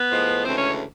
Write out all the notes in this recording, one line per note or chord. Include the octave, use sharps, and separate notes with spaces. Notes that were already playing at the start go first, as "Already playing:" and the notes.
Already playing: B3 B4
A2 F3 G#3
D2 C#3 E3 G#3 C4 C5
C#4 C#5